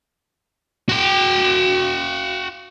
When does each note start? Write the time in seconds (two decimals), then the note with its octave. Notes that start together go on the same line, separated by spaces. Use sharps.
0.89 F#4 G5